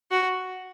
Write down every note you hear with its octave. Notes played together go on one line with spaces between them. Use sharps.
F#4